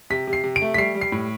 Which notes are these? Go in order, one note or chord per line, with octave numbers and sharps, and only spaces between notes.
C3 B6
C3
C7
C3
D7
A3
B6
G3 C7
G3
C7
A2